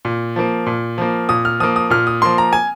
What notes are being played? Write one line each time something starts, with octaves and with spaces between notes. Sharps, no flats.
A#2
F3 A#3
A#2
F3 A#3
A#2 D#6
F6
F3 A#3 D#6
D#6
A#2 F6
D#6
F3 A#3 C6
A#5
G#5